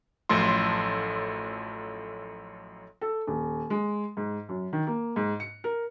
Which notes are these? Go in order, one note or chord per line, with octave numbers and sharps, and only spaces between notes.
A1 F#2 F3 A3 A4 C6
A4
D#1
G#3
G#2
F#2
D#3
A#3
G#2
C#7
A#4